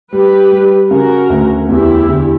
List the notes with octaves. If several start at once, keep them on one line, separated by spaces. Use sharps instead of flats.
G3 G4 B4
G3
C#3 F#4 A#4
D2
E2 E4 G4
D3